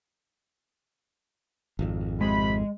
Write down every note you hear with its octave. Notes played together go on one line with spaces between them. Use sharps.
G#1 F2
C3 G#3 B5